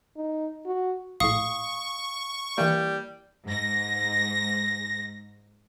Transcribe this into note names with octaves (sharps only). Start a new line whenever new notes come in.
D#4
F#4
A#1 A2 F5 C#6 D#6
E3 G3 A#3
G#2 A#6